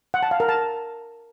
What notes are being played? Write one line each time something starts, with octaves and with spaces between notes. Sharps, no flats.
F#5
A5
F5
A#4
A5